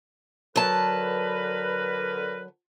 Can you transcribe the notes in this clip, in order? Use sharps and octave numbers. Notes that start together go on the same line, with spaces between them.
D3 F#3 A#4 B4 A5